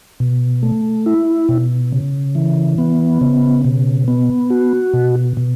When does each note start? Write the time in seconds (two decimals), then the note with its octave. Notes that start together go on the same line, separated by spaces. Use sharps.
0.20 B2
0.63 A3
1.06 E4
1.49 B2
1.92 C#3
2.35 E3
2.78 B3
3.21 C#3
3.65 B2
4.08 B3
4.50 F#4
4.94 B2
5.37 B2